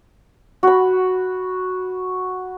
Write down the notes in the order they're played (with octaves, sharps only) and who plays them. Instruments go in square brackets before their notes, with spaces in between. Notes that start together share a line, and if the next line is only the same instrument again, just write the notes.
[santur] F#4 B5